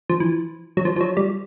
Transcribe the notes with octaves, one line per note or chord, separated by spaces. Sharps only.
F3
E3
F#3
F3
F3
F#3
G3